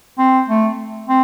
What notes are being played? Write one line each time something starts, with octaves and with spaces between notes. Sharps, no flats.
C4
A3
C4